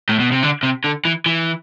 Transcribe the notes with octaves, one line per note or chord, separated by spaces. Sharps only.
A2
B2
C3
D3
C3
D3
E3
E3